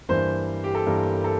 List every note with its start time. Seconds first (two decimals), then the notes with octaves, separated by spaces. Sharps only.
0.09 G2 E3 A#3 C5
0.64 G4
0.75 A4
0.87 G2 E3 A#3 A#4
1.24 A4